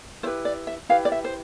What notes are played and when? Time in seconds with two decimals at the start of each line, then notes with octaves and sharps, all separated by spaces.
0.23 E4 G4 B4 C5
0.45 D5
0.67 E5
0.89 E4 G4 B4 F5
1.05 D5
1.12 E5
1.24 C5